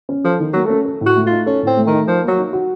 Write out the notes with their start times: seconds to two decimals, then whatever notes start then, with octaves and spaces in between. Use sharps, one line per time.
0.09 C#4
0.24 F3 A4
0.40 D#3
0.53 F#3 A#3
0.65 A3 C#4
0.85 A4
1.01 A2
1.06 F#4
1.16 A3
1.27 D#4 F4
1.46 C#4 A4
1.62 A2 C4
1.77 A3
1.87 D#3
1.92 D#4
2.08 F3 A#4
2.24 F#3 A#3
2.38 D#4
2.53 F#4